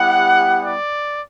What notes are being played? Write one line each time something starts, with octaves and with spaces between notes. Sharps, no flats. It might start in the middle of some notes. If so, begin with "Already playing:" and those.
Already playing: G3 B3 E4 G4 F#5
D5